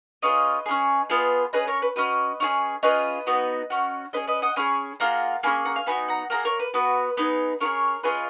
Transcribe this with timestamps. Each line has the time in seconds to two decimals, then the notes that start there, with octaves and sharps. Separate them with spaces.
0.22 C#4 F4 G#4 B4 D#5
0.66 C#4 F4 G#4
1.10 B3 F4 G#4
1.53 C#4 G#4 B4 D#5
1.67 A#4 C#5
1.82 B4
1.96 C#4 F#4 B4 D#5
2.40 C#4 F4 G#4
2.83 C#4 F4 G#4 B4 D#5
3.27 B3 D#4 F#4
3.70 C#4 F#4
4.13 C#4 G#4 B4 D#5
4.27 B4 D#5
4.42 D#5 F#5
4.56 C#4 G#4 G#5 B5
5.00 A#3 F4 G#4 F#5 A#5
5.43 A#3 C#4 G#4 G#5 B5
5.65 F#5 A#5
5.76 F5 G#5
5.87 B3 D#4 F#4 G#5 B5
6.08 F#5 A#5
6.30 A#3 D#4 G#4 F#5 A#5
6.45 A#4 C#5
6.60 B4
6.74 B3 F#4 B4
7.17 B3 D#4 G#4
7.60 C#4 F4 G#4 A#4 C#5
8.03 C#4 F4 G#4 B4 D#5